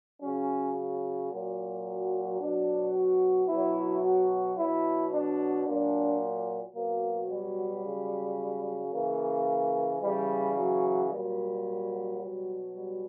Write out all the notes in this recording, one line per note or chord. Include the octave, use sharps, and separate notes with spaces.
C#3 F#3 C#4
A#2 F#3
B2 F#3 D4
F#4
B2 F#3 E4
F#4
B2 F#3 E4
D4
A#2 F#3 D4
B2 F#3 A#3
G3
C#3 F#3
C#3 E3 A#3
C#3 E3 G3
F#3
A#2 F#3 G3
B2 F#3
G3